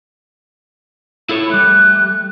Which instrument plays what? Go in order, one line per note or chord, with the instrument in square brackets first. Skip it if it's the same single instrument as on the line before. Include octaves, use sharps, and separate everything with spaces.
[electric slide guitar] E4 A4 C#5 [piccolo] B5
[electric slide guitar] G3 A3 [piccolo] F#6